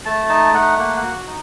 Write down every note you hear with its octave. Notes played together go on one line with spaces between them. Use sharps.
A3 A5
D#4 A5
A3 F#5
A#3 F#5
F#5
F#4
D#4